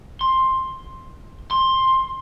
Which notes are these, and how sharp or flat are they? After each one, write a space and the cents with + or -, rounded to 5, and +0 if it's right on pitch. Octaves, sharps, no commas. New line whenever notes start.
C6 +10
C6 +10